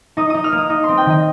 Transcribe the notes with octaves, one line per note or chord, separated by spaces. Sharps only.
D#4 D#6
D#4 D#6
F6
A#3
D#6
D#4 D#6
C4 C6
G5
D#3 D#5